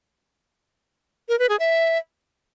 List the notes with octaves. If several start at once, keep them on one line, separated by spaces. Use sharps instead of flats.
A#4
B4
G#4
E5